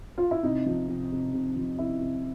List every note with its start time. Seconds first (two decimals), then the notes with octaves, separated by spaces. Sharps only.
0.18 F4
0.31 E4
0.43 C3 D#4
0.66 F3
0.88 C3
1.12 C3
1.33 C3
1.56 F3
1.78 C3 E4
2.01 C3